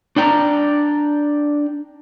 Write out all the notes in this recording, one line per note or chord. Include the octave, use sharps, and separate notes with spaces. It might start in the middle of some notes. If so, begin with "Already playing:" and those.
D4 D5 G5 A#5